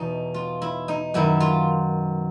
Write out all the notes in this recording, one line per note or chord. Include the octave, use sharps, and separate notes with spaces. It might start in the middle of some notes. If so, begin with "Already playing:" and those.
Already playing: E2 B2 D#4
F4
E4
D#4
F#2 D#3 E4
F4